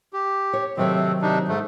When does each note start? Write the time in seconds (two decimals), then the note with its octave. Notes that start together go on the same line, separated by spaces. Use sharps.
0.13 G4
0.53 C#5
0.77 C3 D#3 F#3 A3 C4 C#5
1.22 C3 D4 D#4
1.48 G#2 A3